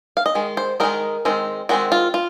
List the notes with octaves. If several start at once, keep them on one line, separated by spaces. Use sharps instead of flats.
F5
D#5
D#3 G#3
C5
D#3 G#3 C4 D#4 A#4
D#3 G#3 C4
D#3 G#3 C4 F#4
F4
F4